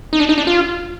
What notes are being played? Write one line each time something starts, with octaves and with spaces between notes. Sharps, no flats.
D#4
D4
D#4
D4
F4